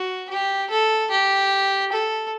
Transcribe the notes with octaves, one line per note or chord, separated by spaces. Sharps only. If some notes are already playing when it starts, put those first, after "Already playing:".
Already playing: F#4
G4
A4
G4
A4